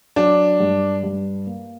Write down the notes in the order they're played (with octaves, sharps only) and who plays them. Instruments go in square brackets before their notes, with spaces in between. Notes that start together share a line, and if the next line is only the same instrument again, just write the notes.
[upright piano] F#3 [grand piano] D4
[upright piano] G2
G2
A#3